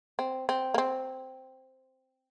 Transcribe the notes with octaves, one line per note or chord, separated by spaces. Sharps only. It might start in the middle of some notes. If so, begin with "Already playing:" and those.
C4
C4
A#3
C4